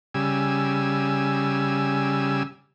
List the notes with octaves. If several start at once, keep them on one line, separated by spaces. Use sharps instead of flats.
C#3 G3 G#5 E6